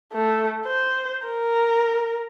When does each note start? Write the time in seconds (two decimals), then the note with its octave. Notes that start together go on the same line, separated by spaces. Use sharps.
0.13 A3
0.66 C5
1.27 A#4